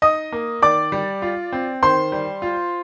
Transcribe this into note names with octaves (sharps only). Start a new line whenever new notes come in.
D#4 D#5 D#6
A#3
D#3 D5 D6
G3
F4
C4
D#3 C5 C6
G3
F4